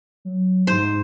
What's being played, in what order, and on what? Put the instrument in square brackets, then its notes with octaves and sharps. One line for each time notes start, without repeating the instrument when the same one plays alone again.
[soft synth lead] F#3
[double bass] G#2 [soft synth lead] D#4 [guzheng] C5